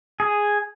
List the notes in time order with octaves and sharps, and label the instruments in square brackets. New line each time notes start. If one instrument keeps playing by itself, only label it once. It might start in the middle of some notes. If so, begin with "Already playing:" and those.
[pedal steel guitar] G#4